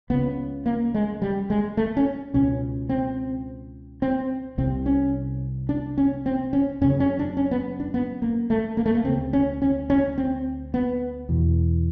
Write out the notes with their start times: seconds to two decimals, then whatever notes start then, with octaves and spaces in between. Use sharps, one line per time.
0.10 C#2 C#3 B3
0.66 A#3
0.94 G#3
1.22 G3
1.50 G#3
1.77 A3
1.97 C#4
2.34 C#2 B2 C#4
2.89 C4
4.02 C4
4.58 C2 C3 C4
4.86 C#4
5.69 D4
5.98 C#4
6.26 C4
6.53 C#4
6.81 F#2 C#4
6.85 C#3
7.00 C#4
7.19 D4
7.37 C#4
7.51 B3
7.80 D4
7.94 B3
8.22 A#3
8.50 A3
8.77 A#3
8.86 A3
8.95 A#3
9.05 D2 C#3 C4
9.33 C#4
9.62 C#4
9.90 C#4
10.18 C4
10.74 B3
11.29 E2 B2